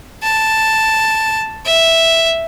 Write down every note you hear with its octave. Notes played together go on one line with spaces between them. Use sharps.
A5
E5